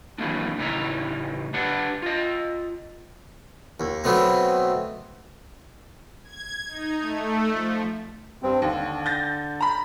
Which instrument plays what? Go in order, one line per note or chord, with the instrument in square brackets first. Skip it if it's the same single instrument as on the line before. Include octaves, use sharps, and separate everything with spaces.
[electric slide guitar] D#3 E3 F#3 A3 A#3 D4
A2 C#3 D#4 E4 C#5 A#5
D4 G4 B4 F#5
F4 D#5
[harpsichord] D#2
B2 F#3 A3 B3 C4
[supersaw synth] G#6
D#4
A3
F3
[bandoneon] G2 C4
[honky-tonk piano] D#2 [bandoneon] D3
[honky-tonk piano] G6 A6 A#6
A#5 B5